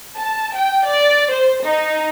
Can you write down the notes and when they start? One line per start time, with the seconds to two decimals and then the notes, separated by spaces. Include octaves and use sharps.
0.15 A5
0.52 G5
0.85 D5
1.31 C5
1.62 D#4